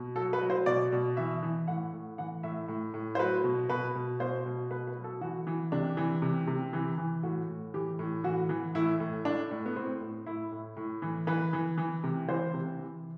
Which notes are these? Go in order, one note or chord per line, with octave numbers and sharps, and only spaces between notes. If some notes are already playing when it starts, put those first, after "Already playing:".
Already playing: B2
F#3 A4
B4
F#3
C5
B2 D5
B2
E3 E5
E3
A2 F#5
A2
E3 F#5
A2 E5
A2
A2
C5
F#3 B4
B2
B2 B4
B2
B2 C5
B2
B2 B4
B4
F#3
A4
E3 F#4
E3
C3 D4
E3
C3
C3
E3
E3
A2 F#4
A2
E3 G4
A2
E3 F#4
E3
A2 E4
A2
A2 D4
A2
B3
A2 C4
A2
A2 E4
A2
A2
E3
E3 B4
E3
E3
C3
E3 C5
C3
E3